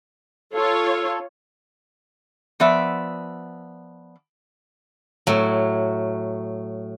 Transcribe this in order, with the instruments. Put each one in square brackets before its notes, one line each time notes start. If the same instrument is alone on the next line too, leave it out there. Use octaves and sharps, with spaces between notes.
[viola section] F4 C#5 [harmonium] A4
[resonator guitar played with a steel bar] F3 B3 D5 E5
[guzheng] A2 F#3